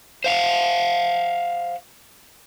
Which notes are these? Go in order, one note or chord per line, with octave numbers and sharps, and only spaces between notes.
C5 F5 F#5